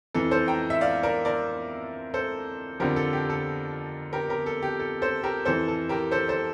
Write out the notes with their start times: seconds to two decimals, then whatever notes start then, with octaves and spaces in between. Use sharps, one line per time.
0.14 F2 E3 A4
0.31 A4 C5
0.48 G5 A#5
0.70 E5
0.81 D5 F5
1.03 A#4 D5
1.25 A#4 D5
2.14 A4 C5
2.80 F2 D3 F3 G4 A#4
2.96 A4
3.13 G4
3.30 A4
4.13 G4 A#4
4.29 G4 A#4
4.46 A4
4.63 G4
4.79 A4
5.02 A4 C5
5.23 G4 A#4
5.45 F2 E3 A4 C5
5.68 A4
5.89 G4 A#4
6.11 A4 C5
6.29 A4 C5